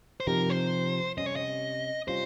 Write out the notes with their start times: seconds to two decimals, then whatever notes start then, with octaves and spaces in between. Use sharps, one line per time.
0.20 C5
0.27 C3 F3 C4 D#4 G4 A#4
0.50 C5
1.17 C3 G3 C#4 D#5
1.26 C#5
1.36 D#5
2.07 C3 G3 C#4 F4 C5